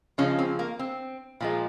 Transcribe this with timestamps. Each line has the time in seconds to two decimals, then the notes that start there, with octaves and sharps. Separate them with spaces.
0.18 C#3 F3 G#3 C#4
0.39 C4
0.59 A#3
0.79 C4
1.41 A#2 F3 G#3